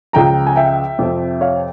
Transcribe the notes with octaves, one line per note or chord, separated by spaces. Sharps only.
C#2 C#3 F3 G5 A#5
G#5
E5 G5
F2 C3 F3 C4
C#5 F5